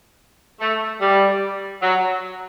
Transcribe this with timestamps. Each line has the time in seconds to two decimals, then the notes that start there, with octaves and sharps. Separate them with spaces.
0.61 A3
1.01 G3
1.82 F#3